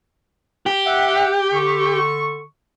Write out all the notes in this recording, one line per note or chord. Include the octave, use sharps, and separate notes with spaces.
G4
E5 F#5
D3 C#6